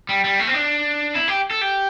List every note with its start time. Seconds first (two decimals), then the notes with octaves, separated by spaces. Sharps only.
0.09 G3
0.24 G3
0.39 A3
0.47 C4
0.54 D4
1.15 E4
1.28 G4
1.51 A4
1.61 G4